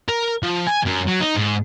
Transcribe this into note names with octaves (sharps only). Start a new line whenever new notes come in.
A#4
F3
G#5
F#2
F#3
D#4
G#2